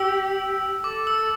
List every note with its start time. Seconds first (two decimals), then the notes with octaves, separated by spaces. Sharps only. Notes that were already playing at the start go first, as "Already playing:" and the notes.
Already playing: G4 E6
0.84 A4 D6
1.07 E6